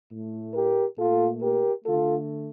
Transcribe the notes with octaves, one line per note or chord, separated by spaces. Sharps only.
A2 A3
G4 A#4
A#2 A3 F4 A4
G4 A#4
D3 A3 F4 A4